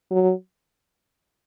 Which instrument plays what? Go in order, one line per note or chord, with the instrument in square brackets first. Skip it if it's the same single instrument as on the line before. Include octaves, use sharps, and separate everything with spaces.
[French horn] F#3